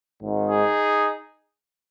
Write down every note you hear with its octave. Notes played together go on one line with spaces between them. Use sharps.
G#1 G#2 D#3
D#4 G#4